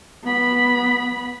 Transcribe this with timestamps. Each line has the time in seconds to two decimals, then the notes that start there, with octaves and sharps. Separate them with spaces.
0.23 B3 B5